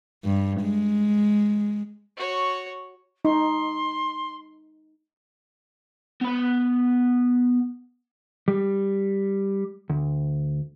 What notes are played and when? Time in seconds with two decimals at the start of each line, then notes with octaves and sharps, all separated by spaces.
0.25 G2
0.62 G#3
2.17 F#4 C#5
3.25 D#4 C6
6.21 B3 B5
8.48 G3
9.90 D2